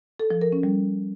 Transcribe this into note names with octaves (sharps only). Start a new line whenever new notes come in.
A4
F3
A#4
C#4
G3